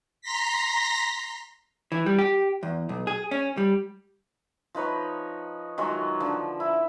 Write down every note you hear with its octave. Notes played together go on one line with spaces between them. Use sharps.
A#5 C6 A#6 B6
E3
G3
G4
E2
B1
G#4
C#4
G3
F3 D#4 B4 C#5
D#3 F#3 G#3 F4
D3 F3
E4